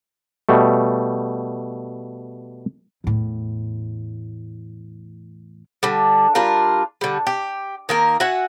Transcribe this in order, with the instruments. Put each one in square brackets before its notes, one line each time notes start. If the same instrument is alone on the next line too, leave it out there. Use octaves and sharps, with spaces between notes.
[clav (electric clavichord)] B2 G3 A3
[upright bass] E2 A2
[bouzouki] D3 G3
G3 D4 F4 A#4
D3 G3
G4
D#3 A#3 A#4
F#4 E5 F#5 G#5